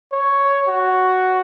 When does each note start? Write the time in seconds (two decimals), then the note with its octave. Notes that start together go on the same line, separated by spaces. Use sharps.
0.12 C#5
0.68 F#4